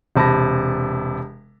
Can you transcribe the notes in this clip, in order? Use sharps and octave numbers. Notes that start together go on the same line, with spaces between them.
E1 C3 A5 B5 A#6